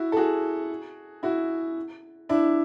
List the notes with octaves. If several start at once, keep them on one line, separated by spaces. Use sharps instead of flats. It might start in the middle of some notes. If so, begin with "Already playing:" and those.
Already playing: E4 F#4
A4
F#4 G#4
E4 F#4
D4 E4